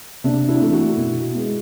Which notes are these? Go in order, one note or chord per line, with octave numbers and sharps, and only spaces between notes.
C3 D4
D4 E4
E3 A3
E4 F#4
B2
G#3 B3